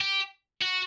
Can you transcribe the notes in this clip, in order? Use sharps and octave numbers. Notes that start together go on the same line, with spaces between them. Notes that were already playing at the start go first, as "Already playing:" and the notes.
G4
F#4